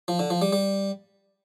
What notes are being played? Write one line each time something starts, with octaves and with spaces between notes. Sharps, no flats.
F3
D3
F3
G3
G3